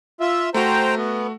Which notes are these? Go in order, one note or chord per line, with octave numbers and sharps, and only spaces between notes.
F4 E5
A3 F#4 C5 G5 A#5
B3